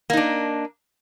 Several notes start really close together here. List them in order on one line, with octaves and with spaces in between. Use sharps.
A#3 D#4 D4